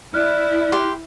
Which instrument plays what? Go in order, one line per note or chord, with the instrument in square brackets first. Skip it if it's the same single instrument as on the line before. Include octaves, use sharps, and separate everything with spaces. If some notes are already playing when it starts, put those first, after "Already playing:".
[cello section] E4 [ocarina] D5 [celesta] F6 F#6
[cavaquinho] G4 C6